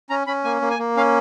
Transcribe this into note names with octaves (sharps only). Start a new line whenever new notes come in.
C#4 A#5
C#4 B5
A#3 G#5
A#3
G#5
A#3
C#4 F5